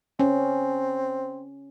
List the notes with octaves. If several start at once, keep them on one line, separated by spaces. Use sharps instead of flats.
C4 C#4